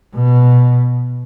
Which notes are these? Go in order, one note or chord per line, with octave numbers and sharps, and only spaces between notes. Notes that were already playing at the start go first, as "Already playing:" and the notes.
B2